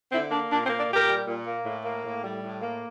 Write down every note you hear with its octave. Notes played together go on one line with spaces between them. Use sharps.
D3 C4 E4
A#3 D4
A#2 D4
C4
A#3
D4
A#2 G4 A#4
G3
A#2
A#3
A2
A#3
A2
G3
A2
A#3